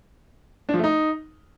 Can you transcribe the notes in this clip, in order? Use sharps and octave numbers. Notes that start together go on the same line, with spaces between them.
D4
F3
A3
D#4